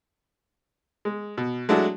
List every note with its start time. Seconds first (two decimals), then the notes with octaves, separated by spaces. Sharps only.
1.05 G#3
1.38 B2
1.69 F#3 G#3 A3 D4 E4 F#4